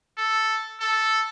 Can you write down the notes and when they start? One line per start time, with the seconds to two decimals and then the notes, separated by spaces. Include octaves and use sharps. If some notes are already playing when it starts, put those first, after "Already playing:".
0.17 A4
0.80 A4